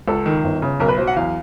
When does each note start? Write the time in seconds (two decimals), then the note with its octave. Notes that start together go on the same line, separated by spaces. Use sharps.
0.08 C#2 A4
0.26 D#3
0.44 G1
0.62 C#3
0.80 B1 A#4
0.88 B4
0.98 F#3 C5
1.07 F#5
1.16 E2 F5